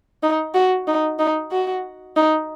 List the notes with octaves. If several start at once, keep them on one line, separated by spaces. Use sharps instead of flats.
D#4
F#4
D#4
D#4
F#4
D#4